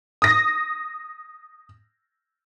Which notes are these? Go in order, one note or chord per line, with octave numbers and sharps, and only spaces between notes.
D#6 A#6